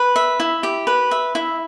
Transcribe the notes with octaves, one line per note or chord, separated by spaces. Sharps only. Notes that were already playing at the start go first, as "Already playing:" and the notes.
Already playing: B4
E5
E4
G4
B4
E5
E4